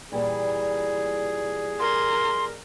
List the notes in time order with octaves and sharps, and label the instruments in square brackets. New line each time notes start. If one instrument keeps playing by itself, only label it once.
[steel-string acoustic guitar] A#2 E3 G3 [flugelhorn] G#4
[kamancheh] A#4 [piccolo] C6